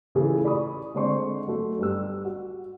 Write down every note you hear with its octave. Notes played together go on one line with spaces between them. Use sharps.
A2 C#3 E3 F4 G#4 A4
D5 B5 C#6 D#6
D3 G#3 C4 D5 C6 C#6
F#3 A3
G1 G4 E6
F#4